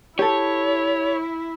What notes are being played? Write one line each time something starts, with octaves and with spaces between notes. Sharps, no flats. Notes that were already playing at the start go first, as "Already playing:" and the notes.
E4 G4 A4 C#5